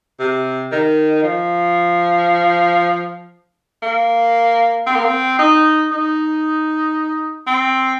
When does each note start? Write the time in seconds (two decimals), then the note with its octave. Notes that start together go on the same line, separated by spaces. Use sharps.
0.19 C3
0.72 D#3
1.23 F3
3.83 A#3
4.87 C4
4.95 A#3
5.05 C4
5.39 D#4
5.92 D#4
7.47 C4